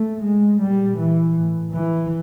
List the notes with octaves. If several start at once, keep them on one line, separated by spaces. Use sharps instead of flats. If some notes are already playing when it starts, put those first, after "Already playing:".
Already playing: A3
G#3
A#2 G3
E3
A2
E3